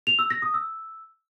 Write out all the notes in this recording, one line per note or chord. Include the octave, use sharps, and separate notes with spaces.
F7
E6
A#6
D#6
E6